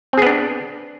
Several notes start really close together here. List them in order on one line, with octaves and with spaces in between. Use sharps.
C4 G#4 B3 D4